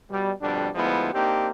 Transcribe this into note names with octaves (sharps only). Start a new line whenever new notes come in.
B2 G3
F2 B2 D3 G3 D4
D2 F3 G#3 B3 E4
A#3 C4 D4 D#4 G4